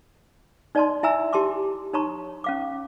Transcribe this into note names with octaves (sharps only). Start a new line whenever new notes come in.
D#4 D5 D#5 A5 B5 C6
E4 E5 G#5 A#5 E6
E4 G4 A5 C6 D6
D#4 C#5 A5 A#5 C6 C#6
C#4 F5 D6